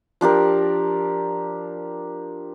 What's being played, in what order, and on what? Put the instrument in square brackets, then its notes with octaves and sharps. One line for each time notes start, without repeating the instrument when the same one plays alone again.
[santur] F3 D4 G4 A#4